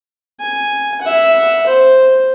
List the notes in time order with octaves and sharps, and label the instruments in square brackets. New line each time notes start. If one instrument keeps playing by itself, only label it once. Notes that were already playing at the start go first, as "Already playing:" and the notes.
[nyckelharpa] G#5
E5 F#5
C5